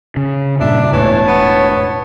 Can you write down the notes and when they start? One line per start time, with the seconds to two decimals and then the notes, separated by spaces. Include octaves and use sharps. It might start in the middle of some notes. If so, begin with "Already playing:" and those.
0.17 C#3
0.60 G2 A#2 C#3 D4 E5
0.92 E1 A2 E3 C#5 A5
1.27 B3
1.71 C#5